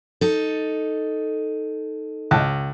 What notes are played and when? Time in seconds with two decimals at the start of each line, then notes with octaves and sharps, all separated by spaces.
0.21 D#4 A4
2.31 C#2 A5 F#6